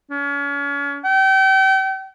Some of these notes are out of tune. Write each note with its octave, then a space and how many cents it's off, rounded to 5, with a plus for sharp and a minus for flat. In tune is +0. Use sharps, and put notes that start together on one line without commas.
C#4 +35
G5 -35